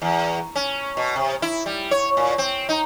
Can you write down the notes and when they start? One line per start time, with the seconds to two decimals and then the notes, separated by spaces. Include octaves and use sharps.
0.02 E2
0.55 C#4
0.97 B2
1.16 C3
1.42 E4
1.66 G3
1.91 C#5
2.17 A#2
2.38 C4
2.69 D#4